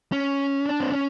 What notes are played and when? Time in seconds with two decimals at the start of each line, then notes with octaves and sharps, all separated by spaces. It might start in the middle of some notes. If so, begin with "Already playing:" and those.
0.12 C#4
0.66 D4
0.81 C4
0.92 C#4